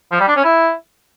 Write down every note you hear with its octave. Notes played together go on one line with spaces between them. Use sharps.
F3
G3
D4
C#4
E4